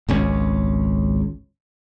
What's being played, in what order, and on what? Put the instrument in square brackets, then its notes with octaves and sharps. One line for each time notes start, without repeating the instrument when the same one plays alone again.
[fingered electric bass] G#1 C#2 C#4